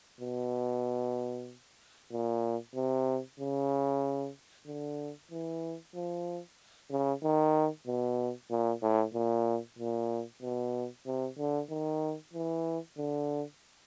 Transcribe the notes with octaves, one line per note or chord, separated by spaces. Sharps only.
B2
A#2
C3
C#3
D3
E3
F3
C#3
D#3
B2
A#2
A2
A#2
A#2
B2
C3
D3
D#3
E3
D3